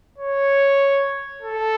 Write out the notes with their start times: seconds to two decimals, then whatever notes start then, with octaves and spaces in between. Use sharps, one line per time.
0.18 C#5
1.42 A4